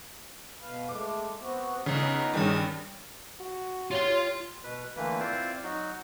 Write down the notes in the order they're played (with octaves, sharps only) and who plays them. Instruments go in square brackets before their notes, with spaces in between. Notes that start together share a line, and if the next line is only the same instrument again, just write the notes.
[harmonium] B2 B4 F5
[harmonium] G#3 A3 [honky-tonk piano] D6
[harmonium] B3 C4 F#4
[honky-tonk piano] C#2 C#3 [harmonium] B3 D#4 A#5
[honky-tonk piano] G2 D#3 G3 [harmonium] C#4 G4 G#4
[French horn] F#4
[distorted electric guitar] F4 C6 [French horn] G4 [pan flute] C#5
[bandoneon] B2 B4
D3 E3 A3 A#3 B4
C4 E4 F4 C5 D5
F#3 D#4 F#4